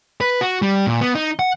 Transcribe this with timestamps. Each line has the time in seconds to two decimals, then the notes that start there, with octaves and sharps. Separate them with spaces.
0.21 B4
0.41 F#4
0.62 G3
0.87 A#2
1.01 B3
1.15 D#4
1.39 F#5